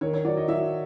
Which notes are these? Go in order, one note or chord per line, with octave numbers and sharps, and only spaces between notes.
D#3 C#5
C#5
F#3 D5
D#5
F#3 E5